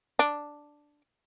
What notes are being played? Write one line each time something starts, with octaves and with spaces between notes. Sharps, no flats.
D4